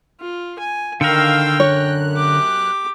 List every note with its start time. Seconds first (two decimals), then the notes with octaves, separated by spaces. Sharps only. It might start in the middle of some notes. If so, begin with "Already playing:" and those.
0.21 F4
0.59 G#5
1.01 D3 D#3 A#4 F5 G5 E6
1.60 F#2 C#5 F#6
2.13 G4 D6